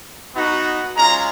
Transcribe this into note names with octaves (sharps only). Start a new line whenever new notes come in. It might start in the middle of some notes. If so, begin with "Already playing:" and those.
B3 D#4 F#4
G#3 C#4 F4 A#5